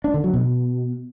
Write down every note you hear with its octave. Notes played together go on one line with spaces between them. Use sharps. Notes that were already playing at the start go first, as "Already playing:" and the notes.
D4
D3
F#3
B2